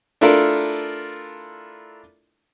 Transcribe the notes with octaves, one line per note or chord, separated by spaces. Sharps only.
A3 D4 E4 F4 A4 A#4